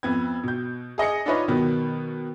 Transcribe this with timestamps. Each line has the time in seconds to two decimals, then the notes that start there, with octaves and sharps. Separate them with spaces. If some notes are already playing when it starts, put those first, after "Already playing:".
0.03 F2 B3 G#6
0.43 B2 G6
0.98 G#4 D#5 D#6 C#7
1.26 D4 D#4 F4 B4 C#5 D#5
1.48 B2 D#3 F#3 B3